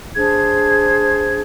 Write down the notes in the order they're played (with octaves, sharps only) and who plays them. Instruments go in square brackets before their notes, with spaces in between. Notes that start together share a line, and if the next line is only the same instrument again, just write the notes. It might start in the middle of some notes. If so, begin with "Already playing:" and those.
[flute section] D4 G#4 C5 G#6